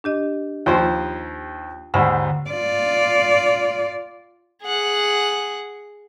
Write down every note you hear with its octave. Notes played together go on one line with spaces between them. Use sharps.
D4 G4 D#5
D#2 F3 F4 C5
D#2 G#2 D3 F#5 B5
F4 D5
G#4 F#5